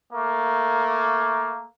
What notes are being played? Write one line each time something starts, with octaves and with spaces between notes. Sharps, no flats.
A3 A#3